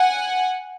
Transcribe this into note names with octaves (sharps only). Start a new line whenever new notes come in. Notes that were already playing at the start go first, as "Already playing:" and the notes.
Already playing: F#5 G#5